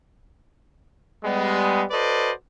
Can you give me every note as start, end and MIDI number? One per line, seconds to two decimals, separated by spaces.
1.23 1.83 55
1.23 1.83 56
1.23 1.83 59
1.90 2.31 66
1.90 2.31 69
1.90 2.31 71
1.90 2.31 72
1.90 2.31 74
1.90 2.31 75